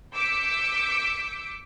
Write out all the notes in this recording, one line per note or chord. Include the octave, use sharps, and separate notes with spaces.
D6 E6 G6 B6 C#7 D7